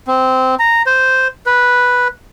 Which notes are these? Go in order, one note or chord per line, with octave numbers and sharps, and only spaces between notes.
C4
A#5
C5
B4